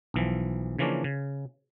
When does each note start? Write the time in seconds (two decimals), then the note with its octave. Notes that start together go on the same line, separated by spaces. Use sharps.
0.14 B1 E3 F3
0.79 C#3 E3 F3 A#3 C#4 D4
1.04 C#3